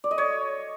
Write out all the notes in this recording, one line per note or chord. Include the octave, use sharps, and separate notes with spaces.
D5
D#5
C#5